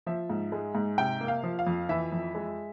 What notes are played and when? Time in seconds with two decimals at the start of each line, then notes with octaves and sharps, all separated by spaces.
0.06 F3 E5
0.30 G#2
0.52 G#3
0.75 G#2
0.98 C3 G5
1.21 A#3
1.28 F5
1.43 F3
1.59 F5
1.67 F2
1.89 E3 E5
2.12 F2
2.35 G#3